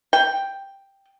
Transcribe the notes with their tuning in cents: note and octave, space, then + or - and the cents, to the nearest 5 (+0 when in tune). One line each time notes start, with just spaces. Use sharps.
G5 +5